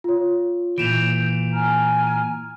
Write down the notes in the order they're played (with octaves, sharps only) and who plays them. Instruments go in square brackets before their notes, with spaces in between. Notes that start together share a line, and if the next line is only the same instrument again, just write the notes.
[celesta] F4 C#5
[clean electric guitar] A#2 E3 [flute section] G6 [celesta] D7 E7 F7
[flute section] G#5 A#5 F6